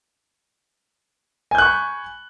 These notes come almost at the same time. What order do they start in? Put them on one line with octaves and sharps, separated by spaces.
G#5 G6 F#6 C#6 B5